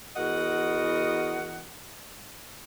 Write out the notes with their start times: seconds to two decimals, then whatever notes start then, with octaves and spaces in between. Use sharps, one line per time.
0.15 E2 F#4 A#4 D#5 F#5